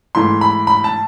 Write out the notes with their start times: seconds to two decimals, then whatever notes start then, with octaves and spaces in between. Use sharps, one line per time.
0.15 G#2 E3 A3 C6
0.41 B5
0.67 B5
0.84 A5